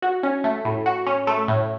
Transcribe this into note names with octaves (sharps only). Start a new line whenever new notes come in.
F#4
C#4
A3
A2
F#4
C#4
A3
A2